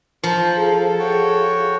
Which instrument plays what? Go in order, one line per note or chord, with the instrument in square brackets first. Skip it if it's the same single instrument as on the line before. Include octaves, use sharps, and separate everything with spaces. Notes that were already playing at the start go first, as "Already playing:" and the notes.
[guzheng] F3 [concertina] C5 [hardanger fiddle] A#5
[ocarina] G#4 [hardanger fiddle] A4
[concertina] F#4 C#5 G5